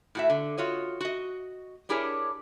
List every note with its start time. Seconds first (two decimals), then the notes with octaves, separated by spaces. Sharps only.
0.15 A2 F#4 E5
0.30 D3
0.58 F4 F#4 C#5 D#5
1.01 F#4 D#5
1.89 D4 E4 G4 G#4 A#4 C#5